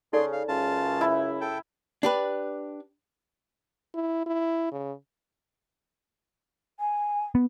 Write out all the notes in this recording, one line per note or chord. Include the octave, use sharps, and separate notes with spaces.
C#3 D#4 G#4 A4 D5 C6
F5
C#2 F#2 C#3 F4 A5
E4
A4 G5
D4 G4 B4
E4
E4
C#3
G#5
B3